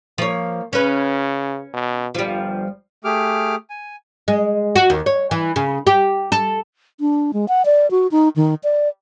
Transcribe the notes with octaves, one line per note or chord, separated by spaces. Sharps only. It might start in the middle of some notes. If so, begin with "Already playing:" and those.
F3 A#3 C#5
C#3 C#4 B4
B2
G1 F3 G3
A3 G4 G#4 D6 F6
G#5
G#3
F#4
D#2
C#5
E3
C#3
G4
A4
D4
G#3
F#5
D5
F#4
D#4
D#3
D5